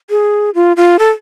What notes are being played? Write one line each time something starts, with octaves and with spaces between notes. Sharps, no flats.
G#4
F4
F4
A4